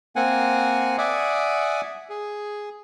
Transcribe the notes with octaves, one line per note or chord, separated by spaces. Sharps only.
A#3 C4 F#5 G#5
D5 E5 F#5 G#5 D6 D#6
G#4